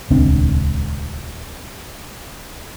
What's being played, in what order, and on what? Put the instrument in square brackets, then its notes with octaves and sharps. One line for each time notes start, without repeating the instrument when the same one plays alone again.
[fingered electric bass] D#1 C#2 C4 D4